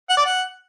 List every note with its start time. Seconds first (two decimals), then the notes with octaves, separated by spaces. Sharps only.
0.09 F#5
0.17 D5
0.25 F#5